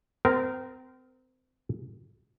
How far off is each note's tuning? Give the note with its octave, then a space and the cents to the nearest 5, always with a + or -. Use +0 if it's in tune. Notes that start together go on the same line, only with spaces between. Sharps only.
C4 -30 A#4 +0